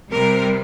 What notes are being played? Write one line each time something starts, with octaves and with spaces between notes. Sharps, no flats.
C3 G3 C4 A#4